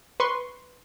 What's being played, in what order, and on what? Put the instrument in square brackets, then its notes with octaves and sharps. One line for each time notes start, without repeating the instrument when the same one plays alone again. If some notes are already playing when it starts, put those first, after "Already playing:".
[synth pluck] B4 C6 C#6